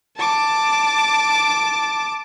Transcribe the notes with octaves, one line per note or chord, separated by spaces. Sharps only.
A5 D6